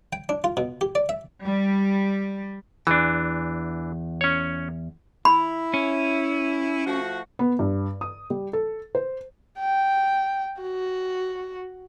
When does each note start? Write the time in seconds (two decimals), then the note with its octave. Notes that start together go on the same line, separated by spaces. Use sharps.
0.13 G5
0.29 D4
0.44 F4
0.57 B2
0.81 G4
0.95 D5
1.09 E5
1.44 G3
2.87 E2 E3 D4
4.21 C#4 C#5
5.25 E4 B5
5.74 C#4
6.85 F3 A3 F#4
7.39 B3
7.59 G2
8.01 D#6
8.30 G3
8.53 A4
8.95 C5
9.59 G5
10.61 F#4